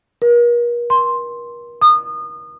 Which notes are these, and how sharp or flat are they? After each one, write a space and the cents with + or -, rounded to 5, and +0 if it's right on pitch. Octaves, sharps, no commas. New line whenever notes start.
A#4 +40
C6 +5
D#6 -30